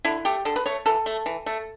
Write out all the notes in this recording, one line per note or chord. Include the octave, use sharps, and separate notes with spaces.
D3 E4
A3 G4
D3 A4
B4
A3 C#5
E3 A4
A3
E3
A3